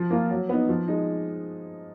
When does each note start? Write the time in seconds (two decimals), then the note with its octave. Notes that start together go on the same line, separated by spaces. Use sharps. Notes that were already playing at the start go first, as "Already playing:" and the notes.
Already playing: F3
0.10 A#3 F4
0.30 F#3
0.49 B3 D#4
0.69 F3
0.88 G#3 D#4